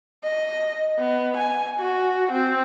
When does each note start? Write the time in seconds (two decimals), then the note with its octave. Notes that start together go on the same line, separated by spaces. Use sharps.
0.24 D#5
0.98 B3
1.37 G#5
1.80 F#4
2.32 C4